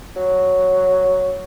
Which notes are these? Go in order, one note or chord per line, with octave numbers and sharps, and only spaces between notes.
F#3